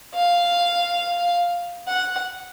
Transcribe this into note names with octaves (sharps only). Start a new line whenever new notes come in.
F5
F#5